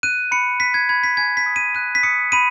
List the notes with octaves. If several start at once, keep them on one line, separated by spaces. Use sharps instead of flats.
F#6 D#7
B5 C#7
F#6 B6
G#6
B5 G#6
B6
G#5 G#6
B6
D#6
D#7
F#6 D#7
B6
D#6 C#7
B5 D#7